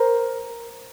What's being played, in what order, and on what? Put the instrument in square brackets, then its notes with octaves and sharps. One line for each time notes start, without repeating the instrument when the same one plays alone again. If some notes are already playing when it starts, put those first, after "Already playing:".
Already playing: [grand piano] A#4 C5